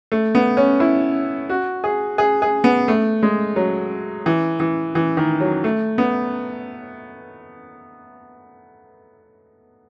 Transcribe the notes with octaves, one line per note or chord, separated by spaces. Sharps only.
A3
B3
C#4
E4
F#4
G#4
G#4
G#4
B3
A3
G#3
F#3
E3
E3
E3
D#3
F#3
A3
B3